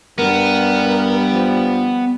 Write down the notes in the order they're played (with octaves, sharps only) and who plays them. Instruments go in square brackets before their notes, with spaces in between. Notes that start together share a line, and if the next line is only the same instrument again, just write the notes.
[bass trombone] G2 [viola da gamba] G3 [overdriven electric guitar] B3 [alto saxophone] A#4
[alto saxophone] F3